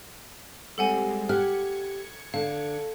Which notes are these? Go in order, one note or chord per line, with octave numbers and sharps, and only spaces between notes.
G3 G#3 C4 A4 F#5 G#5
G4 F#5 F6 G#6 C#7
D3 F5